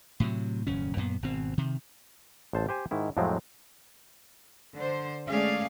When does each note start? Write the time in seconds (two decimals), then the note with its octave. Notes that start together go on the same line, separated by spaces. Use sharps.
0.20 A2 C3 F#3
0.67 D#1 F#2 C#3 C#4
0.96 F#2 A#2 B3
1.22 G#1 B2 C4
1.58 C3 D#3
2.53 A1 C5 A5
2.69 G4 C5 G#5
2.91 G#2 D#3 E4
3.17 F2 A2 F3 F#3 G#3 C4
4.74 D3 C5
5.28 G#3 A3 C#4 G#4 D5 F5